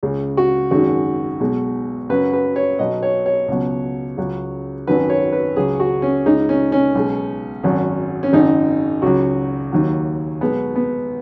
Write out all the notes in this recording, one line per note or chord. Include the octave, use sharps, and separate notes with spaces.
C#2 C#3 G#3
F#4
G#1 F#2 D#3 G#3 F#4
B1 B2 G#3
F#2 C#3 F#3 B4
B4
C#5
B1 B2 F#3 D#5
C#5
C#5
C#2 B2 F#3
C#2 C#3 F#3
G#1 F#2 D#3 F#3 B4
C#5
B4
C#2 C#3 F#3 G#4
F#4
C#4
C#2 C#3 G#3 D#4
C#4
C#4
B1 B2 G#3
G#1 F#2 F#3
C#4
G#1 F#2 C#3 D#4
C#2 C#3 F#3 F#4
D#2 D#3 F#3
B1 B2 G#3 B3
B3